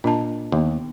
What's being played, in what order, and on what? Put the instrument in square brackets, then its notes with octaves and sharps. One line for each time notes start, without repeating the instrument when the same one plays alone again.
[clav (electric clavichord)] A#2 [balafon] D4 D#5 A5
[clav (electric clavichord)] D#2 [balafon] B3